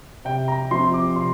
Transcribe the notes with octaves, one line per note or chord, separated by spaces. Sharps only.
C3 G5
A#5
F3 C4 C6
D6
C3 C6